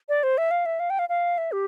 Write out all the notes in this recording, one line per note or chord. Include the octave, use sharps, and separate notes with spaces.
D5
C5
E5
F5
E5
F5
G5
F5
F5
E5
G4